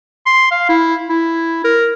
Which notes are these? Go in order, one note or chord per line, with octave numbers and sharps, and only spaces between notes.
C6
F5
E4
E4
A#4